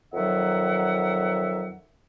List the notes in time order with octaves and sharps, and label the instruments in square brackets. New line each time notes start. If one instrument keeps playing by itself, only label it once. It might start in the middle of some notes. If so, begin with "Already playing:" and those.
[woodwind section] F2 D#3 F#3 E5 F#5